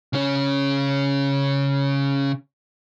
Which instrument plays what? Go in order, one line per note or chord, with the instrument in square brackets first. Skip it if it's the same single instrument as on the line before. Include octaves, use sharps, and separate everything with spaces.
[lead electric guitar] C#3 C#4